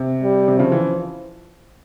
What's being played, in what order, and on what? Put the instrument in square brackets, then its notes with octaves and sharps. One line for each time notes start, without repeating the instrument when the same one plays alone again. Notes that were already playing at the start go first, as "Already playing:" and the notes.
Already playing: [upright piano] C3
[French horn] G3
[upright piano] C3
[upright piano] C#3 [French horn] F3
[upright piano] E3